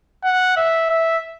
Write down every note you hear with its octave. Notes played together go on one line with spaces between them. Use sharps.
F#5
E5
E5